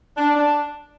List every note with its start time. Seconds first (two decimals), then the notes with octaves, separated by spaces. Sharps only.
0.17 D4
0.34 D4